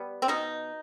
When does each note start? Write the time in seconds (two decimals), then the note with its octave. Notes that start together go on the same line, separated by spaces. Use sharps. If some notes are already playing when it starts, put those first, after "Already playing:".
Already playing: G3 B3
0.22 C4
0.28 B2 D#4